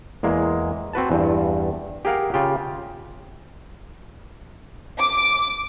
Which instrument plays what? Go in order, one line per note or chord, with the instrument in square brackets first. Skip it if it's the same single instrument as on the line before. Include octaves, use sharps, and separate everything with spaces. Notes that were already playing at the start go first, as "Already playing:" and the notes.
[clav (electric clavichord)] E2 G#3 A#3
C4 F#4 B4 A5
E2 G2
G4 G#4 A#4 F5 F#5
C#3 F4 G4
[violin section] D6